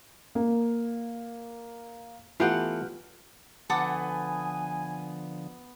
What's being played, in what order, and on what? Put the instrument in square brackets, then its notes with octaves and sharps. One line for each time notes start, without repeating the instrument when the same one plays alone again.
[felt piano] A#3
[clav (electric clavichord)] E3 A3 B3 [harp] F4 G4 F#5
[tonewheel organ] D3 F3 [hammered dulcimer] B3 [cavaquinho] A4 F#5 D6 [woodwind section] G#5